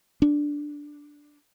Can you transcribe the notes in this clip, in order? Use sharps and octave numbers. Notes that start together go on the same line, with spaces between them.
D4